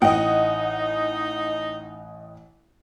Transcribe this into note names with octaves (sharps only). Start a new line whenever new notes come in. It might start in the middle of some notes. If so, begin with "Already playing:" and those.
A1 D#4 D#5 F#5 G5